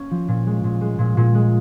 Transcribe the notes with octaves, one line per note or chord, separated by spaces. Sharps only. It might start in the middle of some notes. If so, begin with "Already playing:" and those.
Already playing: A#3 C#4
F3
A#2
G#3
A#2
G#3
A#2
A#2
G#3